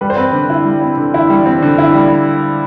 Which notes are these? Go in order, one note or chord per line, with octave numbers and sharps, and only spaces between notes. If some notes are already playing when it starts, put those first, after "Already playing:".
G3 B4
C5
C4 B4
D3
E4
G3
C4
D3
E4
G3
C4
D3
E4
G3